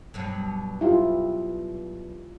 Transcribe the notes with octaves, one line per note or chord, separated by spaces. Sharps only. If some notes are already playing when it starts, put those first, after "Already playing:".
G2 B2 F#3
E4 F4 G4